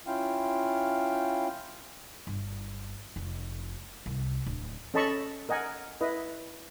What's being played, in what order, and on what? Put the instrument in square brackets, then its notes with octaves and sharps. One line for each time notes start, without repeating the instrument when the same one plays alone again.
[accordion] C#4 E4 F4 F5 G5
[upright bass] G1
F1
C2
D1
[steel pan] C#4 A4 D#5 A5 B5 C#6
A#4 D#5 F#5 G#5
E4 B4 D#5